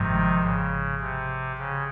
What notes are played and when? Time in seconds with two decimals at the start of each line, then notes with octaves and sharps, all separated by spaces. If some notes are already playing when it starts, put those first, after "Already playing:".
Already playing: G#1 G#2 C3 D#3 F3
0.44 C#3
1.01 C3
1.58 C#3